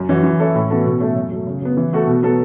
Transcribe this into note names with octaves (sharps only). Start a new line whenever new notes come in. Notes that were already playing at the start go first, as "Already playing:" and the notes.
Already playing: F#2
E3 C#4 F#4
E3
C#4 E4 A4
A2
E3 B3 F#4 A4
B2
A3 C#4 E4 A4
F#2
F#3 A3
C#3
F#3 B3
E3
A3 F#4 A4
B2
F#3 B3 A4